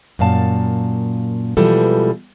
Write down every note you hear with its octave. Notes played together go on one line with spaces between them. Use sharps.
F#2 A#2 F5 A5
B2 E3 F3 G3 G#3 A4